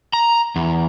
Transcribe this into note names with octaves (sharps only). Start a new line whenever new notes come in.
A#5
E2